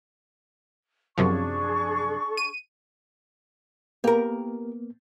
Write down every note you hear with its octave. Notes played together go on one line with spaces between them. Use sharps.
F#2 C3 F3 D4 G#4 C#6
D#7
A#3 B3 G4 A#4